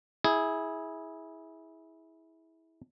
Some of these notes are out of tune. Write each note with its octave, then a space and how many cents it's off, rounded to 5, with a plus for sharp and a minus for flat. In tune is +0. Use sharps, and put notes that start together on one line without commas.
E4 -20 G#4 +0